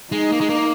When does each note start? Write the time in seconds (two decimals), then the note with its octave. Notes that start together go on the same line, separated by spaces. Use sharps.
0.12 G#3 D#4
0.32 A#3
0.41 G#3
0.49 A#3